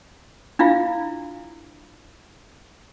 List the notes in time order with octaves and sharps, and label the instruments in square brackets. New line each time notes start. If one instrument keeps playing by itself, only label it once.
[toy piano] D4 E4 F4 F5